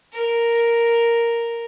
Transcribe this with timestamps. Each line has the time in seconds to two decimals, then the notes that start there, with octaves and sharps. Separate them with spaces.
0.13 A#4